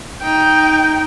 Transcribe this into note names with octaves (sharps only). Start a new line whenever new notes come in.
D#4 G5